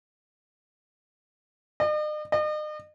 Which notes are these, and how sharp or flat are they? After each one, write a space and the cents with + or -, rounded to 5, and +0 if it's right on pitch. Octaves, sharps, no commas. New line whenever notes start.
D#5 -45
D#5 -40